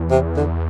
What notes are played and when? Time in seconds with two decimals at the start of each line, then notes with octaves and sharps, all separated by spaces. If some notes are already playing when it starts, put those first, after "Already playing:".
Already playing: E2
0.11 C3
0.37 D3